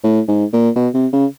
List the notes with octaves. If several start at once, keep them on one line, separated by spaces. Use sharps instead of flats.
A2
G#2
A#2
B2
C3
C#3